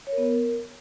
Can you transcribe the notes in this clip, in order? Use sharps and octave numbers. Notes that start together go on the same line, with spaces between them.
C#5
A#4
B3
A#4